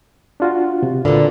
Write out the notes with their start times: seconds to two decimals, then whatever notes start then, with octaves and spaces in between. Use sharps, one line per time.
0.40 D4 F4 F#4
0.83 C3
1.05 A#2 D3 F4 B4 D5